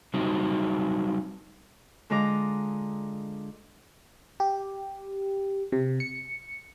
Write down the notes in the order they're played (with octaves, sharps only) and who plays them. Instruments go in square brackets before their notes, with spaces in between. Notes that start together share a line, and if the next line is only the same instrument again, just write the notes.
[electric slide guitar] F#3 G3 C4 D#4 F#4
[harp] D3 G#3 F4 D#5 A#5 D6
[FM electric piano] G4
C3
C#7